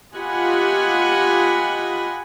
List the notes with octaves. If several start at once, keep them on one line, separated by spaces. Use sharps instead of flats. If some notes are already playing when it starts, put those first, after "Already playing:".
F4 G4 D#5 F#5 G#5 B5